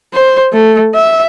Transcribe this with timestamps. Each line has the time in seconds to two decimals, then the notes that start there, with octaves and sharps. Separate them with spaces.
0.14 C5
0.53 A3
0.95 E5